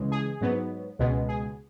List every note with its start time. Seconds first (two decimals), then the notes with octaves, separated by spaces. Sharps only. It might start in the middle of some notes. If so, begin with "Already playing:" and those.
Already playing: C#2 C#3 E3 G#3
0.12 G#4
0.41 G#2 F#3 B3
0.99 C#2 B2 G#3 B3
1.29 G#4